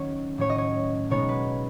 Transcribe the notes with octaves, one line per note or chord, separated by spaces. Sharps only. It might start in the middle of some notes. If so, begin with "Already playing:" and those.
Already playing: D#3 F#3 C#4 C#5
A2 F#3 A3 C#4 C#5
D#5
C#5
B2 G#3 B3 D#4 C#5
B4